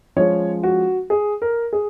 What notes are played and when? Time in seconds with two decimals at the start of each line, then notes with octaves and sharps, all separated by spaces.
0.17 F3 G#3 C#4 C#5
0.63 F#4
1.10 G#4
1.42 A#4
1.73 G#4